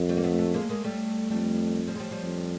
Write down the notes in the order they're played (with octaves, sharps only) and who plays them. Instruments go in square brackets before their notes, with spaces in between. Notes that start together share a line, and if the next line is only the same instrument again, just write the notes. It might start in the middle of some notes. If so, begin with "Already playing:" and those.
Already playing: [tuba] F2
[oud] G3 A3
A#3
A3 B3
A3 B3
G#3 A#3
G#3 A#3
G3 A3
[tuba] F2 [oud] G3 A3
[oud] F3 G3
G#3
F3 G3
F3 G3
[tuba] F2